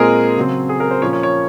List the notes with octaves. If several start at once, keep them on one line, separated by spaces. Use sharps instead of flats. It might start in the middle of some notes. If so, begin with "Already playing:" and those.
Already playing: A#2 G#3 C4 G#4 A#4
C#3 F#3 C4
G#4
A#4
C5
A#2 F3 A#3 C#4 C#5
C#5
C#5